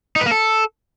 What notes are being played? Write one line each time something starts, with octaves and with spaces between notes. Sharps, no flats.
D#4
B4
A#3
A4